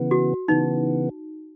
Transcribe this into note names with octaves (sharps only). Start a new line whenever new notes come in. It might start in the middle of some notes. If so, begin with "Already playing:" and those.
Already playing: C#3 E3 B3
F#4
C#3 E3 B3 D#4